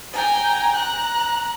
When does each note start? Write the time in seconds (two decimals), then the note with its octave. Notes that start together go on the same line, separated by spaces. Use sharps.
0.14 G5 G#5 A#5
0.76 A#5 F#6